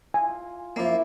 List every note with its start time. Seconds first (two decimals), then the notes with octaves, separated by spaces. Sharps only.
0.14 F4 G#5
0.76 F#2 F3 A#3 E4 D6